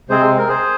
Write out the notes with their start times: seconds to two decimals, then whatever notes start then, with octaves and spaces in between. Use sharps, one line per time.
0.09 C3 G#3 C4 G#4 C5
0.38 A#4
0.48 G#4 C5